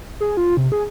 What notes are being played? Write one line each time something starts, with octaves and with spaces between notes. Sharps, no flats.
G#4
F4
C3
G#4